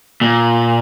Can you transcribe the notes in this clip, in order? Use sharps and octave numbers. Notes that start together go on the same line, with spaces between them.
A#2